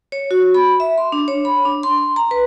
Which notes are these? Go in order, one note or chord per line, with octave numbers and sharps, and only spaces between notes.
C#5
F#4
B5
E5
C6
D4
C#5
B5
D4
C6
A#5
B4